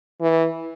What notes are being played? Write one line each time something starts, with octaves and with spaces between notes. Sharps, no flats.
E3